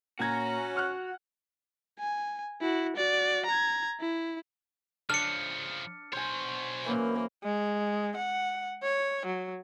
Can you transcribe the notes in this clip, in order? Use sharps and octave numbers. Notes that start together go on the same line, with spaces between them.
A#2 C#4 F#4 A#5 G#6
F#5 C#6 F6 F#6
G#5
E4 F#4
F#4 D5
A#5 G#6
E4
C#3 F3 D4 F6 C#7
B2 C5 C#5 G#5
F#2 E3 A#3
G#3
F#5
C#5
F#3